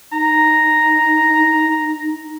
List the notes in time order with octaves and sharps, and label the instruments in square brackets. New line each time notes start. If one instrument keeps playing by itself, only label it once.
[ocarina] D#4 [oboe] A#5